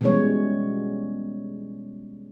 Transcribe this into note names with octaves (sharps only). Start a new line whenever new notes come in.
B2 E3 G3 G#3 C#4 C#5